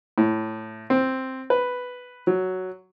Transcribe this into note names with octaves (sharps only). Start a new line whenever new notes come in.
A2
C4
B4
F#3